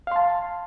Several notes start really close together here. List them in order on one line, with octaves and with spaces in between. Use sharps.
F5 C6 A5